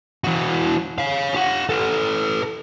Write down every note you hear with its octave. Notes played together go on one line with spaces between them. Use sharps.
E3 F#4
C#5 F5
G4 F#5
A4 B4